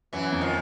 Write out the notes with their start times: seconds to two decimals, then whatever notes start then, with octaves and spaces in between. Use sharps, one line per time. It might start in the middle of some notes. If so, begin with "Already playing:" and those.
0.13 F#2 E3 F#3
0.32 F2
0.41 D#3 F3